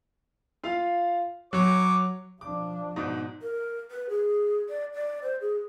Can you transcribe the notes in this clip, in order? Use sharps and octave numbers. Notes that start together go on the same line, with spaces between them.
F4 F5
F#3 C#5 D6
F3 D4 D6
G#2 B2 D#4
A#4
B4
G#4
D5
D5
C5
G#4